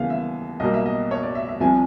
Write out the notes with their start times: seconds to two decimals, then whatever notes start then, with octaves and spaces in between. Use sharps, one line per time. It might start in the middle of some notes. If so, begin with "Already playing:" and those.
Already playing: D#2 C#3 E3 G#3 B3 F5
0.10 E5
0.60 B1 B2 G3 A#3 D#5
0.74 E5
0.86 D#5
1.11 C#5
1.23 D5
1.35 E5
1.49 E5
1.60 C2 C3 F3 G#5